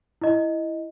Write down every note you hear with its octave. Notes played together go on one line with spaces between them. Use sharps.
E4 D#5